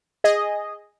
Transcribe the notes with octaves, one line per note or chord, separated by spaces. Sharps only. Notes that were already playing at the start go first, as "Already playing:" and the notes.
G#4 D#5